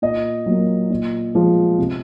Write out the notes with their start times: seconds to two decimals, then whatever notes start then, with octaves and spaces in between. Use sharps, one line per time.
0.02 A#2 D#5
0.46 F#3 A#3
0.90 A#2
1.34 F3 G#3
1.78 C3